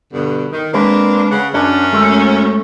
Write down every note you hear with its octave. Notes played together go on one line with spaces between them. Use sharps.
G2 B2 D3
D#3
G#3 A#3 C4 D4 B4
C#3 F#5
F#2 C#4 D4
G#3 A3